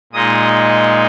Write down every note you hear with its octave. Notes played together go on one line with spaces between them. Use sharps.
A#2 G#3 D#4 D#6